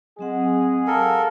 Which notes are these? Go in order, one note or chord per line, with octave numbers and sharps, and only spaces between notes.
F#3 G#3 C4 G#4 F#5
A4 A#4 F5 F#5